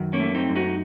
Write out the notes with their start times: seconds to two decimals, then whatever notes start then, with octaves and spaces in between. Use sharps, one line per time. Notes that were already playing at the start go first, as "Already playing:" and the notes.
Already playing: F#2 D#3
0.13 A#3 C#4
0.20 A3
0.35 C4 D#4
0.49 F#2
0.56 D#4 F#4